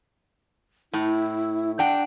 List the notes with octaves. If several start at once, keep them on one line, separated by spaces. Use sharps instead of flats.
A2 E4
D4 F#5 G5